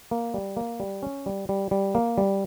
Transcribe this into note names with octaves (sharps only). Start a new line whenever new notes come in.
A#3
G3
A#3
G3
C#4
G3
G3
G3
A#3
G3